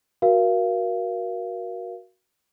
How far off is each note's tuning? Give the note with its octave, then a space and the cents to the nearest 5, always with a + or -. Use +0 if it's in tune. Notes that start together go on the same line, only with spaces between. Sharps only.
F#4 +0 A#4 +20 F5 -30